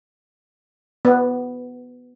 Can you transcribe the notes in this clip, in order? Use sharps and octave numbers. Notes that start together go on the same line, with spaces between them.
B3